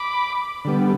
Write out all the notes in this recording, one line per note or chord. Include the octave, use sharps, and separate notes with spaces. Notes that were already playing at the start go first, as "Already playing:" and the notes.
Already playing: B5 D6
D3 G3 B3